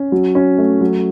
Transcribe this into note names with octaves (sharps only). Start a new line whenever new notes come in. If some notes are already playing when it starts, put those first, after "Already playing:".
Already playing: C#4
F#3
C#4
A3
F#3